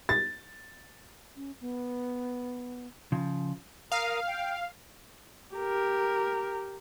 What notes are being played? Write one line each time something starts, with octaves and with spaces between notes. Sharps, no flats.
A6
C#4
B3
C#3 F3
A#4 F5 D#6
G5
G4 A#4